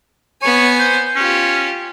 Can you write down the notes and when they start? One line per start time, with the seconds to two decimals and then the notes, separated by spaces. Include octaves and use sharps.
0.42 B3 C#5 G#5
0.79 C5
1.16 C#4 F4 G4